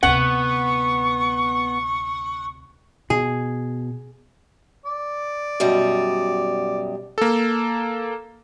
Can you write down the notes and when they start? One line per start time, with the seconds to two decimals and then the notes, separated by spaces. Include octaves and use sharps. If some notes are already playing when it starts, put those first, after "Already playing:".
0.03 D2 C3 B3 F#5 C#6
3.10 B2 G#4
4.86 D5
5.60 F#2 B2 G3
7.18 A#3 A4